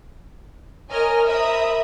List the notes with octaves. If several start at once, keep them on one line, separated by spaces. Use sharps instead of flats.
A#4 C#5 D#5 G#5 F6
A#4 C5 E5 A#5 B5 D#6